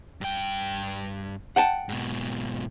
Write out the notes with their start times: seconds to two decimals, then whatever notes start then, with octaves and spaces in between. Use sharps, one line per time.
0.21 G2 G5
1.56 F#5 G5 A5
1.89 G#2 B2